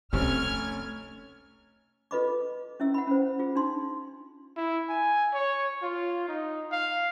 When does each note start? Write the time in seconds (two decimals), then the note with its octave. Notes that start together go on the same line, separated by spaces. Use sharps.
0.13 F1 C2 C3 A3 C#4 E6 F6 G#6
2.11 F4 A4 B4 D#5 B5 D6
2.80 C#4 E4 E5 E6
2.94 F#5 B5
3.07 C#4 C5
3.39 F4 G#4
3.55 D4 D#4 C6
4.57 E4
4.89 G#5
5.34 C#5
5.82 F4
6.28 D#4
6.72 F5